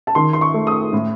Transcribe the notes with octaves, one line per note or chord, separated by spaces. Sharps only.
A5
D#3 C6
C6
C#6
A3
D#6
A2